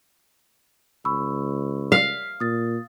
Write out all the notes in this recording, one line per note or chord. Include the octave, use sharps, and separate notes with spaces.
C#2 B5 C#6 E6
F5 B6 C7
A#2 D#6 A6